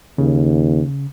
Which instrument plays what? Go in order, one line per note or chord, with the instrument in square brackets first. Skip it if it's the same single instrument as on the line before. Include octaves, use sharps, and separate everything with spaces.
[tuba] D#2 [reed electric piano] C#3